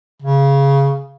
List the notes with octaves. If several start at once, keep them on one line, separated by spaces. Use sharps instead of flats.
C#3